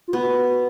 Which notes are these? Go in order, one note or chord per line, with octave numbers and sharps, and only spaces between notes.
F4
B3 F#4